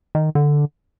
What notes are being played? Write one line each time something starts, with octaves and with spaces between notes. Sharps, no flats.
D#3
D3